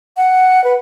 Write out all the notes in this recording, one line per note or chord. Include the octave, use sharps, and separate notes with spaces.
F#5
B4